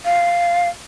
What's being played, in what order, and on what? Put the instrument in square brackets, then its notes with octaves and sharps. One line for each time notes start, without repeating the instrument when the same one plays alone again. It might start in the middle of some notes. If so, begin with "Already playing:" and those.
[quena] F5